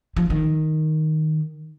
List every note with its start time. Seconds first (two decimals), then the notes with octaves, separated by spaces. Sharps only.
0.16 F3
0.30 D#3